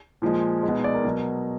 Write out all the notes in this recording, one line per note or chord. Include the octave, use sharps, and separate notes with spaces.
A#2 F3 G#3
G#3
B2
D#4
D5
A#4
B2 F#3